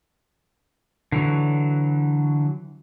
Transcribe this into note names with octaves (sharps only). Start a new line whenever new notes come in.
D3 E3 F#3